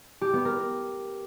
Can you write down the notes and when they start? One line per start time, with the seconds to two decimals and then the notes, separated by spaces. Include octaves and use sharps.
0.21 G4
0.33 B3
0.45 A#4